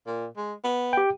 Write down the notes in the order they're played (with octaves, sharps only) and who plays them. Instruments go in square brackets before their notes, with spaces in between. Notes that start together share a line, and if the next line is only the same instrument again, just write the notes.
[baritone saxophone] A#2
G#3
B3
[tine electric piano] G4 G5